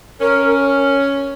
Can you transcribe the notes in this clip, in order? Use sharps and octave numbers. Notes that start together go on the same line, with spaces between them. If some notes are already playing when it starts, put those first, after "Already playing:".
C#4 A#4